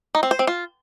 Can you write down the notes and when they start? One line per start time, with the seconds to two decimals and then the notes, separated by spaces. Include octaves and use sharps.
0.15 D#4
0.23 C4
0.31 C5
0.39 C4
0.47 F4